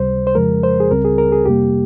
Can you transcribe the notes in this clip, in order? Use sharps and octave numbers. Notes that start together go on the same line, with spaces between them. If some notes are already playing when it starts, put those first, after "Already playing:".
Already playing: C#2 C3 G3 C5
C5
F2 C#3 F3 G#3 A#4
C5
G#4
C#2 C#3 G3 C4 A#4
G#4
A#4
G#4
F2 C3 G3 A#3 G4